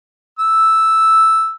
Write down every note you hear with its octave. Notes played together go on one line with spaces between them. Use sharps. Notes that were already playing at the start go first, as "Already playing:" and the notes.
E6